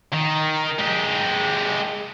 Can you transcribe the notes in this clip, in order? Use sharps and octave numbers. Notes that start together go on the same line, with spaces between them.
D#3
G#3 G4